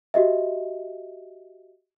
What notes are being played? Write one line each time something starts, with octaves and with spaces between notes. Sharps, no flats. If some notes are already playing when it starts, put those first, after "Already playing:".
F#4 G4 D#5 E5